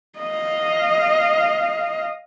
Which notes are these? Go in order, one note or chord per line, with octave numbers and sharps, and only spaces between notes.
D#5 F5